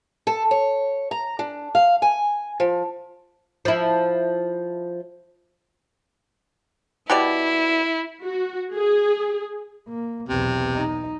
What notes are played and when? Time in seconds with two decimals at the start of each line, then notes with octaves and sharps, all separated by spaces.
0.27 A4
0.51 C#5
1.11 A#5
1.39 D4
1.75 F5
2.02 G#5
2.60 F3
3.65 F3 E4
7.10 B2 E4 G4 D5
8.25 F#4
8.75 G#4
9.89 A#3
10.29 B1 E2 C3
10.76 D#4